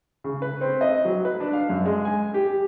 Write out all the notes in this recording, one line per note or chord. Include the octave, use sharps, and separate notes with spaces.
C#3
B4
C4
D#5
F#3
B4
D4
F5
F#2
G#3
G#5
G4